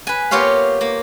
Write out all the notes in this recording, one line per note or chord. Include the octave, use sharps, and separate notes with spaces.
B4 G#5
A#3 B3 F4 G4 C#5 F5
A#3